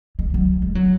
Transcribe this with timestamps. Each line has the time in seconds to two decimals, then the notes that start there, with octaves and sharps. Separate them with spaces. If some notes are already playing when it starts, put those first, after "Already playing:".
0.19 G#3
0.34 F#3
0.62 G#3
0.75 F#3